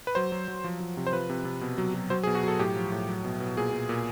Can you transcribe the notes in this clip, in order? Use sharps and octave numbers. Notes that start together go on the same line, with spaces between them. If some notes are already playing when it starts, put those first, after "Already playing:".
B4
F#3 C5
F#3
F#3
F3
F3
C3
C5
F3 B4
C3
C3
B2
F#3
F#3
F#3 C5
G#4
B2
F#4
F#3 A4
A2 G4
F3
A2
F#3
B2
B2
A#2 G#4
A#2
A#2